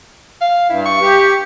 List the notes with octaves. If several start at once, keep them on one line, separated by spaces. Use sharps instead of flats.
F5
G2 E4
C#6
G4